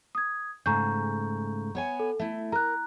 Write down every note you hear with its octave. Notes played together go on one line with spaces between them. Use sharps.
D#6 G#6
G#2 C#3 A3 A#5 C#6 G6
B3 C#5 G#5
A4
A3 E4 E5
A#4 A#5 F#6